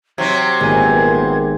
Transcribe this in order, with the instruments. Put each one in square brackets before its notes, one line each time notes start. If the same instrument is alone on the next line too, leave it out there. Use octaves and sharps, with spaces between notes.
[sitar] C3 F#3 C4 [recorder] G#6
[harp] G#1 G#5 [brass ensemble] A#2 B3 G4